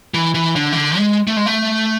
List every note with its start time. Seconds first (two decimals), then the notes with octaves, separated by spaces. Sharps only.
0.14 E3
0.35 E3
0.56 D3
0.72 E3
0.76 D3
0.97 G#3
1.27 A3
1.37 G#3
1.46 A3